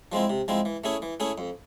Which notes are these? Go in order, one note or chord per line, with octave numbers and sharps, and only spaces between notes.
F3 G#3 C4 E4
C3
F3 G#3 C4 E4
E3
A3 C#4 E4 G#4
E3
A3 C#4 E4 G#4
F2